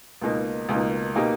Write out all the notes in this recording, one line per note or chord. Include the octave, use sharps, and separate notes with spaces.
C#2 B2 A#3 D#4
C#2 B2 A#3 D#4
B2 A#3 D#4 G4